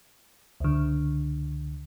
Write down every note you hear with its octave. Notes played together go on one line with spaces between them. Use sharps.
C#2 D3